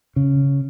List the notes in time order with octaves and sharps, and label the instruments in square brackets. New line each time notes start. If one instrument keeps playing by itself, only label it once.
[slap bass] C#3